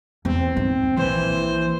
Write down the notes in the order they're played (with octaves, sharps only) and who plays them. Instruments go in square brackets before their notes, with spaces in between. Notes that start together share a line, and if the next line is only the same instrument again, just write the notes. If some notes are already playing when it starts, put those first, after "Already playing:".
[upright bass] E2 [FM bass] C4
[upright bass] G#2 D4
[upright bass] A#1 [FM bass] E3 [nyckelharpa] C5